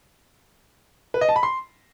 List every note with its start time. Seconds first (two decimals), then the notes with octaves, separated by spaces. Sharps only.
1.14 B4
1.21 D#5
1.29 A5
1.36 B5
1.43 C6